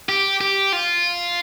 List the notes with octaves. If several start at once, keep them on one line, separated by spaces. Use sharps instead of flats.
G4
G4
F4